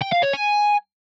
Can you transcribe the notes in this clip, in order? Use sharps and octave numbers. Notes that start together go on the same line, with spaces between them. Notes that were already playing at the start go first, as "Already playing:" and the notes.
G5
F5
C#5
G#5